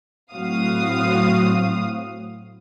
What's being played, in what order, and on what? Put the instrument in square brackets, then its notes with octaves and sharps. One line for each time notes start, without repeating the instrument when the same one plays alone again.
[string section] A2 F#3 C4 F#4 F5 D#6